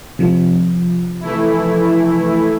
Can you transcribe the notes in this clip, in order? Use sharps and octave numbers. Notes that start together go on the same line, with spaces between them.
C3 F3
E3 A3 E4